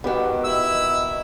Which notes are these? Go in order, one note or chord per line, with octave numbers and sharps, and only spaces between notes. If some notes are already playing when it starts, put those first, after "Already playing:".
B2 D#3 B3 G4 F#5
E4 E6